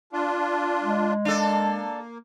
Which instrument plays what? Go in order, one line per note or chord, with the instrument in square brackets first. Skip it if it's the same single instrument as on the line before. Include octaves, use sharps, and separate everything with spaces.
[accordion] D4 F4
[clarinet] G#3
[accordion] A#3 [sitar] D4 A4